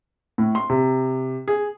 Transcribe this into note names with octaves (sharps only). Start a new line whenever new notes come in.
A2
C6
C3
G#4